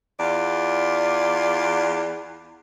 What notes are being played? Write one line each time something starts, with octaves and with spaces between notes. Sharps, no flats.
E2 F4 D5